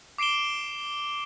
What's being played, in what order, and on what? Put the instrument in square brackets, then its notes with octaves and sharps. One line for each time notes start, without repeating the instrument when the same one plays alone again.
[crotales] D6 C7 D7 E7 G7